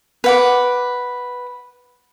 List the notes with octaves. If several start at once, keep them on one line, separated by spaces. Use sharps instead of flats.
B4 F#5 D6